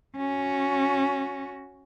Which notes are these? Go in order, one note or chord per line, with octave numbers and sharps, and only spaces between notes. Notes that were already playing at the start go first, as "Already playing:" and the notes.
C#4 F#4